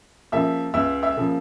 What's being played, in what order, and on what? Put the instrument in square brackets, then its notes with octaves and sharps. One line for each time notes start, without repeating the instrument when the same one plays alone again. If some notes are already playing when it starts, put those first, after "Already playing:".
[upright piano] C#3 F3 A#3 E5 E6
C#2 E5 E6
E5 E6
C#3 F3 A#3